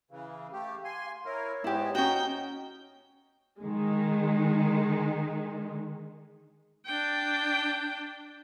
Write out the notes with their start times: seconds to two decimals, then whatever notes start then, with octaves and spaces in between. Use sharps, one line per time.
0.11 C#3 E3 F5
0.53 A3 G4
0.85 G#5 C6
1.25 E4 A#4 C#5
1.64 G#2 G#3 B3 E4 G4
1.95 C#4 D#4 F#4 G5
3.59 D#3 G#3
6.86 D4 G5